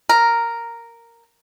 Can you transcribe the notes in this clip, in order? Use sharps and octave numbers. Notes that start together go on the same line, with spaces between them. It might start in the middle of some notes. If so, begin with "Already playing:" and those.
A#4